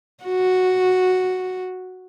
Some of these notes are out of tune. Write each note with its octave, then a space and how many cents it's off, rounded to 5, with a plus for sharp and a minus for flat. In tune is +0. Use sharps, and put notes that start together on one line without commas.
F#4 -5